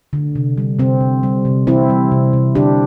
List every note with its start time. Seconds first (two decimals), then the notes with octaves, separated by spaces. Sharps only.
0.13 D3
0.35 C3
0.58 G3
0.79 C3 C4
1.00 C3
1.23 G3
1.45 C3
1.67 E3 C4 E4
1.89 G3
2.11 C3
2.33 C3
2.55 D3 D4 G4